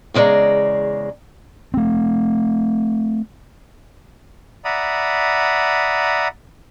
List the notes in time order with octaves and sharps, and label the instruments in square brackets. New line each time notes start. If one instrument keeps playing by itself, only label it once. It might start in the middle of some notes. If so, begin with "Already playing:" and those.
[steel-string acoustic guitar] E2 C#3 G#3 D5 A#5
[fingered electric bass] A3 C4
[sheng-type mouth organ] D5 E5 F#5 A#5 B5 D#6